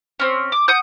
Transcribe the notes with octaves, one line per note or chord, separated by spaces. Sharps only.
C4 C#4
D6
F#5 D#6 G6